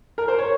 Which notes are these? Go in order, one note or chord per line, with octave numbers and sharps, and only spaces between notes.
A#4
C5
C#5